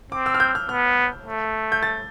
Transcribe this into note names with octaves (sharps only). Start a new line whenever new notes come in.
C4 D6
E6
F6
G6
F6
B3 F6
A3
G6
A6